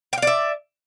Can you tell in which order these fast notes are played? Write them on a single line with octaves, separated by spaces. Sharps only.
G5 F5 D5 E5